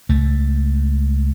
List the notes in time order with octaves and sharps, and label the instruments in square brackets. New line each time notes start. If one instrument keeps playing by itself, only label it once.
[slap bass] C#2 A3